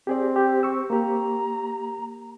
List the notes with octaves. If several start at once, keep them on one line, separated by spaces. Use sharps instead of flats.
C4 G4 G#4 D5
G4
C#6 E6
A#3 G4 A#5